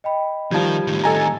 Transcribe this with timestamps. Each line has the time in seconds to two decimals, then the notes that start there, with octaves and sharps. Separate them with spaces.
0.04 D#5 G5 B5
0.51 D#3 F3 G3 G#6
0.87 A2 D#3
1.04 A4 D#5 G#5 A#5